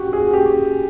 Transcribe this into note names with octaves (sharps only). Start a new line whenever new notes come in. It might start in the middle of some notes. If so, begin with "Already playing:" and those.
Already playing: F#4 G4
G#4
G4